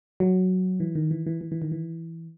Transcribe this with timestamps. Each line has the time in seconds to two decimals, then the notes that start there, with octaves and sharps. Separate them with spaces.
0.20 F#3
0.80 E3
0.95 D#3
1.11 E3
1.26 E3
1.41 E3
1.52 E3
1.62 D#3
1.72 E3